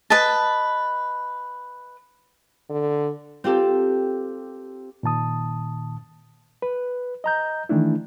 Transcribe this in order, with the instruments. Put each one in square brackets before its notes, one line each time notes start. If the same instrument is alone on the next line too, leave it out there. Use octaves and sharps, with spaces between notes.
[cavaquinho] B4 D#5 A5
[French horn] D3
[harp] C4 F4 G4 A4
[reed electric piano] A#2 D#3 A5 D#6
B4
D#5 A#5 G6
D#3 E3 A3 D4 E4